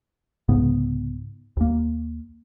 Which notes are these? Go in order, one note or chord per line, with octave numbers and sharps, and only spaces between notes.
C2 G#2 C#3 B3
D#2 A#3